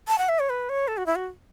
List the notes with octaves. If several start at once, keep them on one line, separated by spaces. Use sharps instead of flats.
A5
F#5
E5
C#5
B4
C#5
A4
F#4
E4
F#4